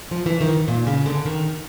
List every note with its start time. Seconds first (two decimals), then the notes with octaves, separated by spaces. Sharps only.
0.11 F3
0.26 E3
0.41 D#3
0.68 A#2
0.87 C#3
1.06 D3
1.25 D#3